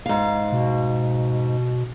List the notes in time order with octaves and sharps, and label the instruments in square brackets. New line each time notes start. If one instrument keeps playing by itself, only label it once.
[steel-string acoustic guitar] G#2 F5
[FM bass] B2